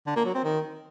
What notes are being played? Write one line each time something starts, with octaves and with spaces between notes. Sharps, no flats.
D3
A#3
F#3
C4
D#3